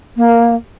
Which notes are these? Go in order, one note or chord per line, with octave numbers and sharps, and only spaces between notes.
A#3